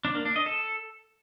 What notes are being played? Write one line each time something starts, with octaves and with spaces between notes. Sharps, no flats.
D4
A#3
D4
D#5
A4